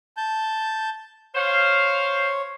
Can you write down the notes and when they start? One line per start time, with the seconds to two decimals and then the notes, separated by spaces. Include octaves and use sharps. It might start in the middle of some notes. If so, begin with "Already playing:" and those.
0.17 A5 G6
1.35 C5 C#5 F5